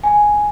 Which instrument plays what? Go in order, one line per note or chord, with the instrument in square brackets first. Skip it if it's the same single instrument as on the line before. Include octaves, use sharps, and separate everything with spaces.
[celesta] G#5